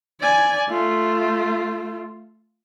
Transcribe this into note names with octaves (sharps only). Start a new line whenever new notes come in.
D5 G#5
A3 F4